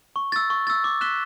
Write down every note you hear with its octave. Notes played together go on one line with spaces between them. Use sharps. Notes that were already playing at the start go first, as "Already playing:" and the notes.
C#6
E6 A6
C#6
E6 A6
D6
F#6 B6 E7 G7